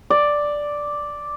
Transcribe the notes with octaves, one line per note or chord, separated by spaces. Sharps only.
D5